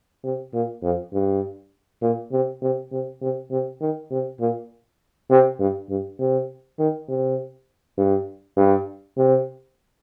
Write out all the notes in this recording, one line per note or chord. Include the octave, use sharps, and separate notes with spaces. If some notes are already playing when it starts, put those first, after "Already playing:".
C3
A#2
F2
G2
A#2
C3
C3
C3
C3
C3
D#3
C3
A#2
C3
G2
G2
C3
D#3
C3
G2
G2
C3